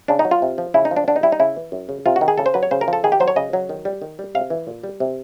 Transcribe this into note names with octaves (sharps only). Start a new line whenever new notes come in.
C#3 D4
D#4
F#3
F4
C3
F3
C#3 E4
D#4
F3
D4
D3 D4
D#4
G3 E4
D#4
C#3 E4
E3
F#2
C#3
C3 F4
F#4
D#3
G#4
C#3 A4
C5
F#3 B4
C#5
C#3 C5
A#4
F3 A4
D#3 G#4
G4
F#3 C5
C#5
C#3 D#5
F#3
D#3
G3
D#3
G3
C3 F5
E3
A#2
G3
C3